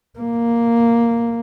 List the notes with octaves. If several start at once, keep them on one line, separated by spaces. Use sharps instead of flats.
A#3